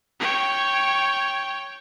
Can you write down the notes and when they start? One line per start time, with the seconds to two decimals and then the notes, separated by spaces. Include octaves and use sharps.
0.20 C#5 G5